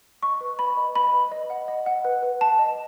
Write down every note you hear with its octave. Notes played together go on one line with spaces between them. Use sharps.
D#5 C#6
B4
B4 B5
D#5
B4 B5
B4
D#5
F#5
D#5
F#5
B4
B4
B4 A5
D#5